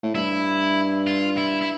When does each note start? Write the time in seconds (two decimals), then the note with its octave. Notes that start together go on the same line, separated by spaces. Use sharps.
0.03 A2
0.15 G2 E4
1.07 F4
1.38 E4
1.62 E4